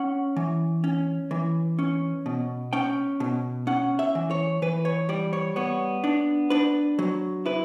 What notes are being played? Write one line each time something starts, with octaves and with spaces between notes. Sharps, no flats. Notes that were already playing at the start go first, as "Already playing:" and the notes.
Already playing: C#4 F#5
E3
C#4
E3
C#4
B2
C#4 G5
B2
C#4 F#5
E5
E3
C#5
E3 B4
C#5
G3 D5
C#5
B3 C#5
D4
D4 B4
F#3
E4 B4